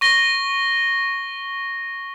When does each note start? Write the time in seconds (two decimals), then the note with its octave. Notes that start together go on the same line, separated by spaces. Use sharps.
0.01 C#6 A#6 G7